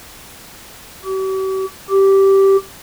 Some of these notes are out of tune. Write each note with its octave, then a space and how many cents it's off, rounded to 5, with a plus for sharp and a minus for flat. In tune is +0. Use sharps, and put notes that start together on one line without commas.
G4 -45
G4 -10